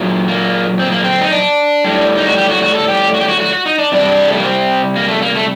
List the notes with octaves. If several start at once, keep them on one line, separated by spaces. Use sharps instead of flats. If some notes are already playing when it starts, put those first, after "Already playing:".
Already playing: A#2 F#3
A#3
C4
A#3
C4
D#4
D4
A2 G3
D#4
F#4
G4
F#4
F#4
A4
G4
F#4
G4
F#4
F#4
F#4
D#4
D4
C3 G3 D4
A3
A#3
C4
A#3
A3
A#3
A3